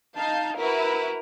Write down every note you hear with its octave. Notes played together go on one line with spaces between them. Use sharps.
D#4 F5 A5 G6
E4 F#4 A#4 B4